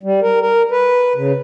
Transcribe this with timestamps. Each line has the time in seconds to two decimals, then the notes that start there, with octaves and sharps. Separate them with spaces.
0.03 G3
0.22 A#4
0.41 A#4
0.71 B4
1.16 C#3